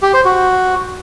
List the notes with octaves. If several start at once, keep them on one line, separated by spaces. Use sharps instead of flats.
G4
C5
F#4